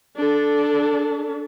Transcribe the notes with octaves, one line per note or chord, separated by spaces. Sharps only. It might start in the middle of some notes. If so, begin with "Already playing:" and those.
D4 A4